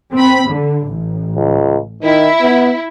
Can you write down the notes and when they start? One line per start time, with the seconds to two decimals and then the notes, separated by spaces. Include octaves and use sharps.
0.14 C4 B5
0.50 D3
0.87 A1
1.36 C#2
2.03 D#3 E4
2.41 B3